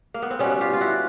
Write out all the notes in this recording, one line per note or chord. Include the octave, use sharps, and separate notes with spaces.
A#3
B3
C4
B2 G3 B3 C#4
F4 G4
F4
E4 F#4